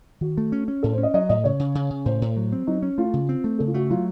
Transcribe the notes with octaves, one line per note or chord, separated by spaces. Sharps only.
D#3 F#4
A3
C#4
C#4
A2 A4
C5
C#4
D#5
F#3 D#5
A2 D#5
C#3 C#5
C#3
C#3
C#3
A2 C5
A2
F#3
C4
F#3 D#4
C#4
A3 F4
C#3
C4
A3
C#3 A4
F4
A3 F#4
F#3 F4